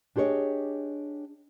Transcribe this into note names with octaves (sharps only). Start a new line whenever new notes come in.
D4 G4 G#4 C5 C#5 D#5